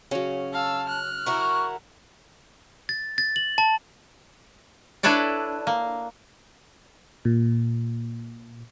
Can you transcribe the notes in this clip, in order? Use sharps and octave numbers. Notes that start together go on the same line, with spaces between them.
C#3 F#3 C#4
F5 A5 E6
F6 F#6
E4 F#4 A#4 C#6
A6
A6
F#7
A5
D4 E4 A4 B4 C#5 D5
A#3
A#2